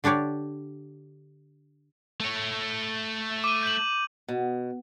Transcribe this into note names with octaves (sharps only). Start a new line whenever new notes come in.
D3 D4 G4 C#5 D5
A3 C#5
D6 D#7
G6 F#7
B2